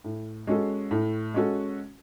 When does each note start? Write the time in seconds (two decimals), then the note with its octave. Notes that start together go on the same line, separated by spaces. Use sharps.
0.04 A2
0.47 G#3 C#4 F#4 A4
0.91 A2
1.34 G#3 C#4 F#4 A4